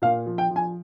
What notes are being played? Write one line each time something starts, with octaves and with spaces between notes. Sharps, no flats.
A#2 F5
F3
G5
F3
G#5